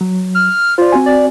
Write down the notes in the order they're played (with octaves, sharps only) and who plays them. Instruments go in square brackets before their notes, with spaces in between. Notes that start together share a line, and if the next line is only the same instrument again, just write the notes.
[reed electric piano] F#3
[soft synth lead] F6
[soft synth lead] F4 [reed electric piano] C5 D5
[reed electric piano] C4 F#4 G#5
[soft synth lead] D5